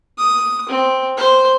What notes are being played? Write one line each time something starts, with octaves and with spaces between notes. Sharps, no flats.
D#6
C4
C5